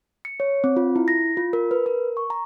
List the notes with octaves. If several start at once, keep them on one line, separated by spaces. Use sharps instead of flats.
C#7
C#5
C4
F4
E4
A#6
F4
A#4
B4
A#4
C#6
A#5